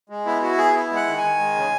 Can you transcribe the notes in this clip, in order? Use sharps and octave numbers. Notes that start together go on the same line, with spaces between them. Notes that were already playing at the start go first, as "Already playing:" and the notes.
G#3
B3 E4
E4 F#4
B3 G#4
E4
G#3
F#5
D#3
G#5
D#3
G#3
C#3